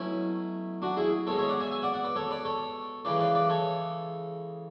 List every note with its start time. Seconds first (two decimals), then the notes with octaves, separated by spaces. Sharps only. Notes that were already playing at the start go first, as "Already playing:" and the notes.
Already playing: B2 F#3 A3 C#4 E4
0.82 D4 F#4
0.97 E4 G#4
1.27 B2 G#3 A4 C#5
1.38 C#5 E5
1.49 D5 F#5
1.60 E5 G#5
1.71 E5 G#5
1.82 D5 F#5
1.94 D5 F#5
2.04 B4 D5
2.16 A4 C#5
2.31 B4 D5
2.45 A4 C#5
3.05 C#3 E3 G#3 B4 D5
3.20 B4 D5
3.35 B4 D5
3.49 A4 C#5